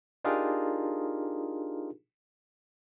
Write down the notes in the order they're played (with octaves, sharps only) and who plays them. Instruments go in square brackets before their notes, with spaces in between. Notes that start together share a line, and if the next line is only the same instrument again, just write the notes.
[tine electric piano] D4 D#4 F4 G4 G#4 A#4